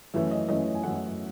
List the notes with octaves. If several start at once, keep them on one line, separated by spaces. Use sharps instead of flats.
F#2 E3 A3 C#4 E5
D#5
F#2 E3 A3 C#4 D#5
G#5
F#2 E3 A3 C#4 F#5